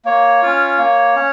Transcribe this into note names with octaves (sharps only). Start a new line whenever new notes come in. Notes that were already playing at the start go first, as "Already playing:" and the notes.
A#3 C#5
C#4 F4
A#3
C#4